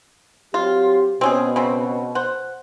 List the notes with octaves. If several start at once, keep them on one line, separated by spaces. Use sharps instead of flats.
F#3 C4 F4 G4
B2 C4 C#4 G#4
C#3 C4
C5 F#5